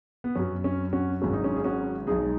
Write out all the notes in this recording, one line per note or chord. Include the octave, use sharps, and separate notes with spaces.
B3
F#2 F#3 C#4
C#4
C#4 F#4
G#1 G#2 F#3 C#4
D#4
C#4
G#4
C#4 F#4
B1 B2 G#3 D#4 G#4